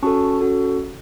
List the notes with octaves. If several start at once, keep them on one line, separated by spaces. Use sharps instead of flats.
C#4 F#4 A4 A5 C#6
C#4 F#4 A4